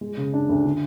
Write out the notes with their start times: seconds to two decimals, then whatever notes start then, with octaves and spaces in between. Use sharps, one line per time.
0.01 G#3
0.17 C#3
0.33 D4
0.49 D2
0.65 D3